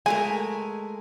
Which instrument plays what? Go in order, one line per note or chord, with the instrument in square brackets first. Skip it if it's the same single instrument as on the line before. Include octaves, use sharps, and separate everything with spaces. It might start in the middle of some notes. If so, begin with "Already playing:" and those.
[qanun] G#3 A3 A#4 [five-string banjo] G#5